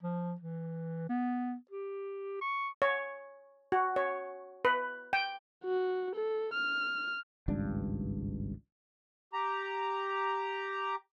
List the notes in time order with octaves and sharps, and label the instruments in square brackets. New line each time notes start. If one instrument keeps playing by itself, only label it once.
[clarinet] F3
E3
B3
G4
C#6
[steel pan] C#5
F#4
C#5
B4
G5
[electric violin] F#4
A4
F6
[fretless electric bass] G#1 C#2 G2 D4
[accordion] G4 A#5